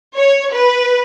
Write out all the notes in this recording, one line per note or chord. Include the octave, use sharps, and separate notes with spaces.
C#5
B4